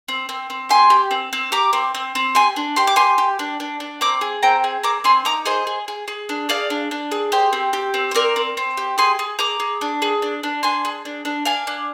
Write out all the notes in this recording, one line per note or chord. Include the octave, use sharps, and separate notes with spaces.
C4
C4
C4
G4 G#5 C6
G4
C4
C4
G4 A#5 D6
C4
C4
C4
G4 G#5 C6
D4
G4 C6
D6
G4 G#5 C6
G4
D4
D4
D4
C4 A#5 D6
G#4
C4 G5 A#5
G#4
C4 A#5 D6
C4 G#5 C6
D#4 A#5 D6
G#4 C5 D#5
G#4
G#4
G#4
D4
G#4 D5 F5
D4
D4
G#4
G4 C5
C4
G4
C4
C5
C4 A#4 D5
C4
C4
G4
G#4 G#5 C6
G#4
G#4 A#5 D6
G#4
D4
G#4
D4
D4
D4 G#5 C6
G#4
D4
D4
D4 F5 G#5
D4